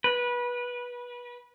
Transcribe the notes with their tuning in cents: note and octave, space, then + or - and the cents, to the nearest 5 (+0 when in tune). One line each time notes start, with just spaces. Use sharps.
B4 -20